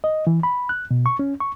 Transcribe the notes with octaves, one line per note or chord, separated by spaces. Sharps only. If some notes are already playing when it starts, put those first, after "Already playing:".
D#5
E3
B5
F#6
B2
C#6
C#4
C#6